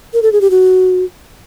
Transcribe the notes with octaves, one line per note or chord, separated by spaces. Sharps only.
A#4
A4
G#4
G4
F#4